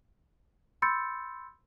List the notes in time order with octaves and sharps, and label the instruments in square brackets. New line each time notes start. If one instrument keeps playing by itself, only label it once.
[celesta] B5 C6 E6 G6 A6 C#7